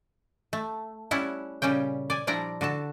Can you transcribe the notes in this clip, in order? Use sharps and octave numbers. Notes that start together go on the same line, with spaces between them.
A3
G3 C#4 E4 F#5 A5
A#2 C#3 G3 C#4 G5
D5 G#5
F3 G3 D4 E4 D5 A#5
D3 F#4 A4 A5